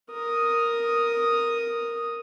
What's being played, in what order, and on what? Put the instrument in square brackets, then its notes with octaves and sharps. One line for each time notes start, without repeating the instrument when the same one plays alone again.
[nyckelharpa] A#4 D#6